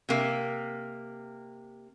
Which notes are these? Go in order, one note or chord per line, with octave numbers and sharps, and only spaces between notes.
C3 A#3